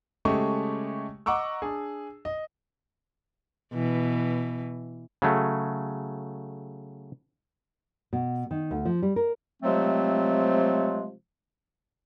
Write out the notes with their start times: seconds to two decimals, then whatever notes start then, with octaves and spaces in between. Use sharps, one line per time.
0.25 C#3 G#3 A3 G4 C#6
1.26 D#5 F#5 A#5 C#6 D6 E6
1.62 D4 G#4
2.25 D#5
3.73 B2 E3
5.22 C#3 F#3 A3
8.13 B2
8.51 D#3
8.71 D2
8.85 F3
9.02 G3
9.16 A#4
9.63 C3 F3 F#3 G#3 A3 C4